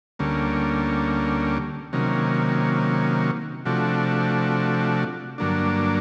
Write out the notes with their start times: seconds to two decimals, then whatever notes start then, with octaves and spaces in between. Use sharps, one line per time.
0.19 D2 D3 G3 A#3 C#4
1.93 C3 D#3 F#3 A#3 C#4
3.65 C3 F3 A3 D4 F#4
5.38 G2 D3 F#3 A#3 D4